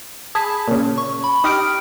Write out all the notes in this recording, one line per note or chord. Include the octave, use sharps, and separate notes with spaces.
G#4 G#5 A5 B5
A#2 C#3
C#6
B5
D#4 G4 D#6 F6 D7